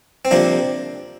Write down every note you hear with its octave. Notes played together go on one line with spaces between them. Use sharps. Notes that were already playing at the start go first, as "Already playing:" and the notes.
C4
C3 F3 A#3 D4